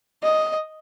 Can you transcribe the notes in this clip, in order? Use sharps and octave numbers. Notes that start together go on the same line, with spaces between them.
D#5